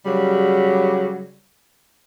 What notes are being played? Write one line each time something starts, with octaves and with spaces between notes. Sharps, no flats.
C#3 F#3 G3